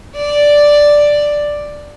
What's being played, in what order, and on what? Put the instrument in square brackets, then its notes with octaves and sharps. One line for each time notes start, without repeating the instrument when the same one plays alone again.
[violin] D5